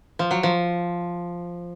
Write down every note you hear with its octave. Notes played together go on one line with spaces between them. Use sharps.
F3
F#3
F3